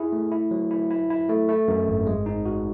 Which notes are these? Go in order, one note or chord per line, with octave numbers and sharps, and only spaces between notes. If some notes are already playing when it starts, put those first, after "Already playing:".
Already playing: E4 G#4
A3
E4
F#3
E4
E4
E4
A3
A3
F#2
G#1
G#3
D#4
F#4